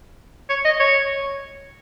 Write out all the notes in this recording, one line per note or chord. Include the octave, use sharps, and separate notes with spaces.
C#5
D#5
C#5